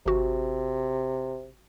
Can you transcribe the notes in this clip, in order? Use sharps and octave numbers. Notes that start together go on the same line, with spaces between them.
G#1 C3 F#4